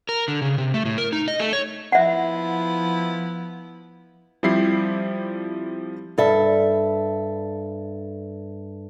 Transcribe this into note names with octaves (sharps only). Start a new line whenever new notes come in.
A#4
D3
C#3
C3
A3
A2
A#4
D#4
D#5
A3
C#5
F3 B3 E4 E5 F#5
F3 G3 C4 E4 G4 C7
G2 A4 E5